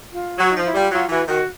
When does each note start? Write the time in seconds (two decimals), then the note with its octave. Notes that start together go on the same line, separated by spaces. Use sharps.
0.12 F4
0.38 F#3 F#4
0.51 F3 D#4
0.65 E4
0.74 G3 F4
0.91 F#3 F4
1.09 E3 F#4
1.27 D#3 F#4